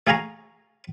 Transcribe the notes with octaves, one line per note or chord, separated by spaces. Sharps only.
A3 G#4 F5 G#5 A#5 C#6